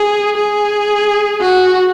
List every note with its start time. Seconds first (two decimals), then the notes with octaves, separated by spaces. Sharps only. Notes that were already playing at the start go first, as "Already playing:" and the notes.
Already playing: G#4
0.37 G#4
1.41 F#4